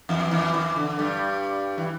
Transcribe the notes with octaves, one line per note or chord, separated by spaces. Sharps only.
E2 E3
E2 E3
E2 E3
D3
G2 G3
E3